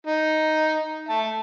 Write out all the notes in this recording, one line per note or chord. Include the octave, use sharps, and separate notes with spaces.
D#4
E5 A5